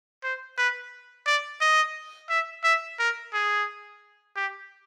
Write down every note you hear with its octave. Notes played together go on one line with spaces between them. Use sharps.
C5
B4
D5
D#5
E5
E5
A#4
G#4
G4